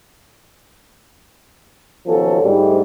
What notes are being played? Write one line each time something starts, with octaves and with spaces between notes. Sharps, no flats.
D#2 B2 F3 F#3 C#4 A4
D2 G#2 G3